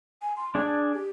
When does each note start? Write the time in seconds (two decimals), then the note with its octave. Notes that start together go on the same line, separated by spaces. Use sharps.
0.22 G#5
0.37 C6
0.55 D4 G#4 G#5 A5
0.94 G4